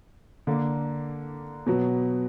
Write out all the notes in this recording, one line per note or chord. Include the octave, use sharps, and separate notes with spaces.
D3 A#3 D4
B2 F#3 B3